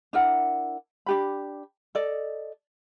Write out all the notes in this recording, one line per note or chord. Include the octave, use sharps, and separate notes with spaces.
D4 E4 A#4 F#5
D4 G4 B5
A4 D5 D#5